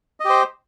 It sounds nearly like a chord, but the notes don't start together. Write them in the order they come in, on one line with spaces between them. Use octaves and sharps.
D#5 G4 C5